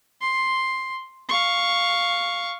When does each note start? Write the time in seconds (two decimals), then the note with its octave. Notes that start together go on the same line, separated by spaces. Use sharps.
0.21 C6
1.29 F5 C#6